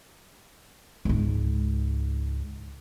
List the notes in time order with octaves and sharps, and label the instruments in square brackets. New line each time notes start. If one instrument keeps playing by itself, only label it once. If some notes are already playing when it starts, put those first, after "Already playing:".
[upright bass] C#2 G#2